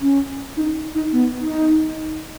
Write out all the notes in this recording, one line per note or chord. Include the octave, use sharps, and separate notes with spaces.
C#4
D#4
D#4
B3
D#4